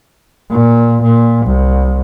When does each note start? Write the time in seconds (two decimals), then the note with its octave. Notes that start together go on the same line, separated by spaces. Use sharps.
0.51 A#2
1.02 A#2
1.46 C2